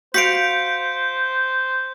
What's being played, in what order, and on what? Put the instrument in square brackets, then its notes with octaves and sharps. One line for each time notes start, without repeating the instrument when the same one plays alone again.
[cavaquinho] F#4 F5 [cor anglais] C5 [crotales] G6 [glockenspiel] B6 C#7 D7